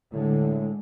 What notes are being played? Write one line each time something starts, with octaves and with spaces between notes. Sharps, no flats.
A2 D3 G#3